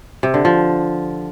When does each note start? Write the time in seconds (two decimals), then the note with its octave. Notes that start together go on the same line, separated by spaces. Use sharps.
0.23 C3
0.34 D3
0.45 F3